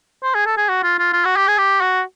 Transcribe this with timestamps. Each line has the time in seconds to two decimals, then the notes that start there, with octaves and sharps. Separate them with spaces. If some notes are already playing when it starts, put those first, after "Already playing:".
0.23 C5
0.35 G#4
0.46 A4
0.57 G#4
0.69 F#4
0.83 F4
0.99 F4
1.13 F4
1.25 F#4
1.36 G4
1.48 G#4
1.58 G4
1.81 F#4